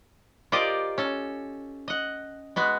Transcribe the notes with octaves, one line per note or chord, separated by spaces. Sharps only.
F4 G4 A#4 C5 D5 D#5
C#4 A4
D#5 F#5
G#3 B3 F#4